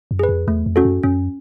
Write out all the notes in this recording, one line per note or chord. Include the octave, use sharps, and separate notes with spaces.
F#2
G#4 B4
F2
E2 A3
F2
C#4 F#4 A4
F#2
F#2 C#4